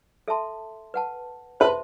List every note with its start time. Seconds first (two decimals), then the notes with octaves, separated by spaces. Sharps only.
0.28 A4 E5 A5 C6
0.94 B4 F#5 A5
1.60 B4 C5 E5 A5 C6